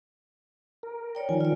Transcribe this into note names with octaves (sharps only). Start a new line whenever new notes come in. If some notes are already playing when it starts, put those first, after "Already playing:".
A#4
C#5 D5 G5
D#3 F3 G#5
F4 D5